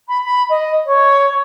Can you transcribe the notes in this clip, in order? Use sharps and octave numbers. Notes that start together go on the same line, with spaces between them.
B5
B5
D#5
C#5